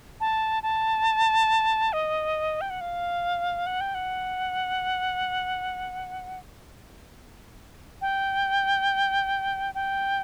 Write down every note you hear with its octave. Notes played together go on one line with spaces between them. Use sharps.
A5
A5
D#5
G5
F#5
F5
F#5
G5
F#5
G5
G5